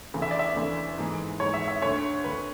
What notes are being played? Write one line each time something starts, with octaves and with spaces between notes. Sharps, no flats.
D2 C#3 E3
E5
D5
E5
D2 C#3 E3
G#2 E3
G#2 E3 C#5
E5
E5
D2 D3 C#5
D2 D3 B4